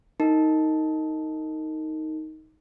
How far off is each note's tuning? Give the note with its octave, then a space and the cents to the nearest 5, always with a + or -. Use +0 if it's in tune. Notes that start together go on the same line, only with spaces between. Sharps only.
D#4 +10 A#4 -35